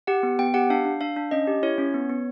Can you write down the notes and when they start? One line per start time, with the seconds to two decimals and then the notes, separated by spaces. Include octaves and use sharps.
0.07 G4 F#5
0.23 B3
0.39 B3 G5
0.54 G4 F#5
0.70 D4 F5
0.85 D4
1.01 D4 F5
1.16 D4
1.31 C#4 D#5
1.47 G4
1.63 E4 C#5
1.78 C#4
1.94 B3
2.09 B3